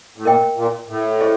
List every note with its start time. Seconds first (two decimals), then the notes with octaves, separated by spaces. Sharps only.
0.17 A2
0.25 A#2 A#4 D#5 G5
0.57 A#2
0.88 A2
1.20 G#4 C5 D#5